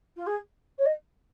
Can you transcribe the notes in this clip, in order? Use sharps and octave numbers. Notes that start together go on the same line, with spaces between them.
F4
G#4
C#5
D#5